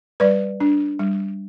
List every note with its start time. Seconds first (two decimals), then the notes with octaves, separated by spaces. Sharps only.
0.20 G3 B4 D5
0.60 D4
0.99 G3